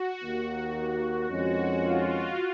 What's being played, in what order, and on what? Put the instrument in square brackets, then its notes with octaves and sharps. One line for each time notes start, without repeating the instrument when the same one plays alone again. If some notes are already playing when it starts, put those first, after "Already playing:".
Already playing: [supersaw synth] F#4
[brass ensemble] D#2 D#3 A#3
[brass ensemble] F2 D#3 G#3 C#4 [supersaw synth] F#4
[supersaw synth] F4